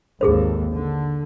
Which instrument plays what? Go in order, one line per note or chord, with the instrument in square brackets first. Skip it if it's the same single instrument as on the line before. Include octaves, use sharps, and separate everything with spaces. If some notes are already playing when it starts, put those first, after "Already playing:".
[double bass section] G#1 D#2 [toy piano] G#4 A4 C5
[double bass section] D3